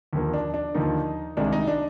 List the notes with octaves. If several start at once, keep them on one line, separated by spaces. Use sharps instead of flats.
D#2 D3 F3 A#3
D4
D4
D#2 D3 F3 A#3 D#4
C2 C3 D#3 G#3 D4
D#4
D4